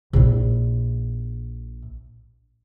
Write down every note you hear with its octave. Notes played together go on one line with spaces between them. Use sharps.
A#1 E4